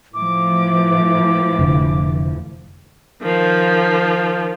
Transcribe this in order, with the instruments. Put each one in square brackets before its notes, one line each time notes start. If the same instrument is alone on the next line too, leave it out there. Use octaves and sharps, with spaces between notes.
[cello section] A2 E3 F3 [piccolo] D6
[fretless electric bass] F1 D3
[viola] D#3 F3